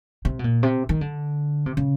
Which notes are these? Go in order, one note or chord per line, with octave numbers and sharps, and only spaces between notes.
C3
B2
A#2
C3
D#3
D3
C3
C#3